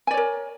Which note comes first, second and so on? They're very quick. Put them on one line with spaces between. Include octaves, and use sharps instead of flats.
G#5 D5 C#5 A#4